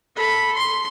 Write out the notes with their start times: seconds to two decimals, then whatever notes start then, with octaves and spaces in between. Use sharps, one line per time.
0.16 A4 B5
0.55 C6